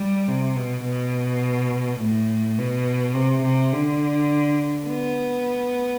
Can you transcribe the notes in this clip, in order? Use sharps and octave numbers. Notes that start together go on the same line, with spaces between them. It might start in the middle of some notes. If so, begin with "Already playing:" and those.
Already playing: G3
C3
B2
B2
A2
B2
C3
C3
D3
B3